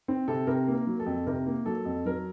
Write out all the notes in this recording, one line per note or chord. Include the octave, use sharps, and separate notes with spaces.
C4
C3 A4
C3 A#4
A#3
A#4
F#3
A4
F2
C3 A#4
A#3
F#3 A4
F2
F#3 A#4